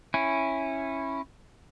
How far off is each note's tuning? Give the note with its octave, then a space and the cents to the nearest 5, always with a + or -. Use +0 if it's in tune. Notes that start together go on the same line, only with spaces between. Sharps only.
C#4 -15 E4 +0